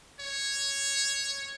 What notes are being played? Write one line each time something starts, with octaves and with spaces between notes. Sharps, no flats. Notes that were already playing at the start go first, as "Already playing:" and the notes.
C#5